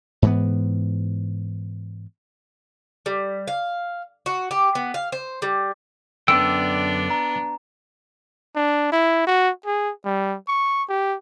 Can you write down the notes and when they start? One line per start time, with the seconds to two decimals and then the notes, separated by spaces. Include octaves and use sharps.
0.22 G#2 E3 B3
3.06 G3
3.48 F5
4.26 F#4
4.51 G4
4.75 B3
4.94 F5
5.12 C5
5.42 G3
6.28 F#2 D3 B3 D4 G5 E6
7.10 A#5
8.55 D4
8.92 E4
9.27 F#4
9.66 G#4
10.05 G3
10.48 C#6
10.89 G4